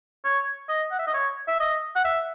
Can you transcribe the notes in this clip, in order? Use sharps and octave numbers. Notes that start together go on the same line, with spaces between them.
C#5
D#5
F#5
E5
D#5
C#5
E5
D#5
F#5
E5